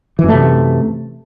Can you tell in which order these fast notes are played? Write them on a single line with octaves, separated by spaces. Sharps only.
E3 F#2 A3 C3